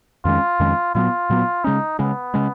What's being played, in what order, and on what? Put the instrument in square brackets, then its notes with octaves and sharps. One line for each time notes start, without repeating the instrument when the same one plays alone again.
[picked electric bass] F2 D#3 G#3 C#4 [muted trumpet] F4
[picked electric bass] F2 D#3 G#3 C#4
[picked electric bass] A#2 F#3 B3 [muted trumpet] F4
[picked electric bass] A#2 F#3 B3
[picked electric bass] C#3 G#3 C#4 [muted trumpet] D#4
[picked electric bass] C#3 G#3 C#4 [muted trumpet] B3
[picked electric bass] C#3 G#3 C#4